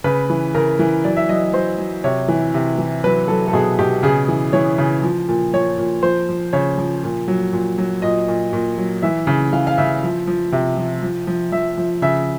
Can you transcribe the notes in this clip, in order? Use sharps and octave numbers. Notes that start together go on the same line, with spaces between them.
C#3 B4
E3
C#3 A#4
E3
F#3 D5
E5
F#3 D#5
F#3 C5
F#3
C3 C#5
E3
C3
E3
F#3 B4
F#3 A4
A4
B2 G#4
B2 G4
C#3 G#4
E3
E3 C#5
C#3
F3
A#2
F3 C#5
A#2
F3 C5
F3
C#3 C#5
F3
A#2
F#3
A#2
F#3
A#2 D#5
A#2
A#2
F#3
E3 E5
C#3
E3 F5
F5
C#3 E5
F3
F3
C3
F3
F3
F3
F3 E5
F3
C#3 E5